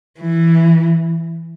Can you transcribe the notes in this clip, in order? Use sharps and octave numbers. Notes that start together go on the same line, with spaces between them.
E3